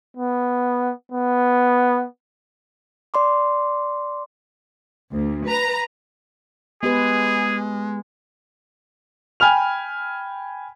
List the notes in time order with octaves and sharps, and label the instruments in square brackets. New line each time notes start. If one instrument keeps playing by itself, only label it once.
[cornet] B3
B3
[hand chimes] D5 C6 D6
[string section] D2
B4 A#5
[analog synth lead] G#3 [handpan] B3 G4 B4 [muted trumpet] G#4
[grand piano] G5 G#5 B5 F6 F7